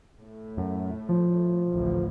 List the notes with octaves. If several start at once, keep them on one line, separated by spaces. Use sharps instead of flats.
A2 A3
F#2
F3
A1 D2